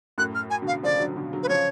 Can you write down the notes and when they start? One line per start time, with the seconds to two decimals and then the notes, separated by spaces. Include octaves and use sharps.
0.18 F#2 A2 F#6
0.35 F6
0.50 G#5
0.62 B2 D3
0.67 F5
0.83 C#3 F3 D5
1.00 D3 F#3
1.16 B2 D3
1.33 D3 F#3
1.43 B4
1.49 C#3 F3 C#5